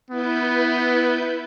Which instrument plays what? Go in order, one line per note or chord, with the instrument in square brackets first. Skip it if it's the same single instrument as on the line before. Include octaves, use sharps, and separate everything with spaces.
[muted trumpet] B3 [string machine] E4 B4 G6